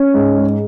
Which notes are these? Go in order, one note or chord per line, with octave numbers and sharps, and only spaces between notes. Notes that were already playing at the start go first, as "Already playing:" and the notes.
Already playing: C#4
G#2
G#3